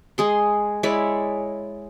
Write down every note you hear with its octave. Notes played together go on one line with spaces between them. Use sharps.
G#3 G#4 C6
G#3 E4 C#5 D5